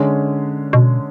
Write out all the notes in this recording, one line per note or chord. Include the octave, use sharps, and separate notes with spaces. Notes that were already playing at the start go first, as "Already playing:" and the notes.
Already playing: D3 G#3 C#4
B2